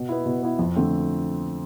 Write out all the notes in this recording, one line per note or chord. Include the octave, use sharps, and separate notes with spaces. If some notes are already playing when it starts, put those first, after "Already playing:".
Already playing: B2
B3 E4
B2
B3 E4
F2
D3 A3 C4